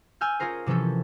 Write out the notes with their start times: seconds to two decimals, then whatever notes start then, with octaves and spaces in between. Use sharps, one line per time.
0.21 G#5 E6 F6 G6
0.40 C#4 F4 G#4 A#4 C5
0.66 C3 E3 F3 C#4 A4